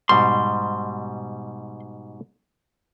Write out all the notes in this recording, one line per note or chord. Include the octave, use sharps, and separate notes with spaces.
G#2 B2 G3 C6